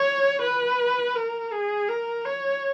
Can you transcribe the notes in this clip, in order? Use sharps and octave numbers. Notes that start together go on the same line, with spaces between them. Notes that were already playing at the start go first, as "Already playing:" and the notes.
Already playing: C#5
B4
A#4
G#4
A#4
C#5